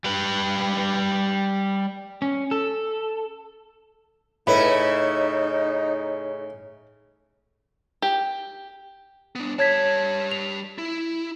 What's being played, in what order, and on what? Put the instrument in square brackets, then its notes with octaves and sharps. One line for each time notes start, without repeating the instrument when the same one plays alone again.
[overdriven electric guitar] G3 B4
[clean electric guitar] C#4
A4
[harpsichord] A2 [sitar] C#3 E4 [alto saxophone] D#4 [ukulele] B4
[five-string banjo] G4
[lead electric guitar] B3 D4
[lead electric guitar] G3 A5 [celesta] C#5 G#6 B6
[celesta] F7
[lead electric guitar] E4